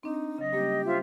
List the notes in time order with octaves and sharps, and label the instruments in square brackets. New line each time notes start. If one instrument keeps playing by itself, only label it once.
[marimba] C4 D4 [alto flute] D#4
[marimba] C#3 F#3 [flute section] D#5
[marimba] G3 A#3 C#4 [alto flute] G4
[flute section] F4 C5 E5